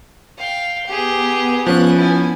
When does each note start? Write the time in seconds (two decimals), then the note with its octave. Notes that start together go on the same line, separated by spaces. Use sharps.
0.37 F5 G5
0.86 B3 G4 G#4
1.67 F3 C#4 F#6
1.96 E4 G#5